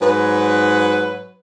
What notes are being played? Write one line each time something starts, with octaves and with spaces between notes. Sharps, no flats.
G#2 F#3 B4